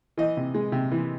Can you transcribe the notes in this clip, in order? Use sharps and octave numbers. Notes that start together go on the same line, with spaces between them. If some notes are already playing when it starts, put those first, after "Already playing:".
E3 D#5
C3
G#3
C3
E3